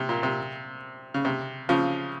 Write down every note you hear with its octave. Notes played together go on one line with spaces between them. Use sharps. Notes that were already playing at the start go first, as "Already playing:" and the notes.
Already playing: C3
A#2
C3
C#3
C3
C#3 F3